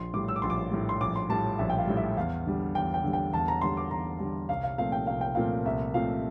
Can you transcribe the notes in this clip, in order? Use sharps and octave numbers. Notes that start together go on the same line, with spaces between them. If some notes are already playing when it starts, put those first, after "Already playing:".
Already playing: A#1 C6
A2 G3 D6
E6
D6
A#1 C6
D6
A2 G3
C6
A#1 D6
C6
A2 G3 A5
A#1 E5
G5
F5
A2 G3
E5
E2 F5
D3 G3
E2 G5
G5
D3 G3
G5
E2 A5
A#5
D3 G3 C6
D6
E2 A#5
D3 G3
C2 F5
F5
A#2 F3 A3 C4 F5
G5
C2 F5
G5
A#2 F3 A3 C4 F5
C2 E5
A#2 F3 A3 C4 F5